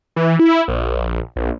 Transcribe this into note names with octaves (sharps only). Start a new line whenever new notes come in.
E3
E4
A#1
A#1